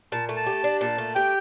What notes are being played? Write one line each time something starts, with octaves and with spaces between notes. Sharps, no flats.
A#2 A5
A3
A5
G4
D4
A#2 A5
A3
G4 G5